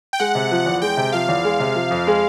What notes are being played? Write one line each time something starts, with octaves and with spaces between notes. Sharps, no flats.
G5
G#3 F#5
C3
F3
E2
G#3 G5
C3
F3 F5
E2
G#3
C3
F3
F2
G#3